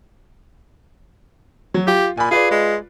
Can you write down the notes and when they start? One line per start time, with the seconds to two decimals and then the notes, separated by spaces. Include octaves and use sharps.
1.74 F#3
1.87 F4 G4
2.17 A#2 G#5 B5
2.31 F4 G#4 B4 D5
2.51 G#3